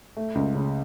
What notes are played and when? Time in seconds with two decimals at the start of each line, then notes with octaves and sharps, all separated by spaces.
0.17 A3
0.35 C#2
0.55 C#3